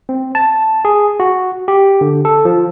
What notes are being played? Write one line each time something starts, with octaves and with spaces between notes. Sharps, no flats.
C4
A5
G#4
F#4
G4
D3
A4
F3